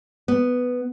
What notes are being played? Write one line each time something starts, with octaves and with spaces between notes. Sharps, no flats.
B3